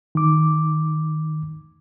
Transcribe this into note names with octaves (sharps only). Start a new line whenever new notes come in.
D#3 D6